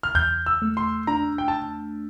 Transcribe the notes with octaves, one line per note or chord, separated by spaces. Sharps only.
F6
E2 G6
E6
A3
C6
D4 A#5
G5
A5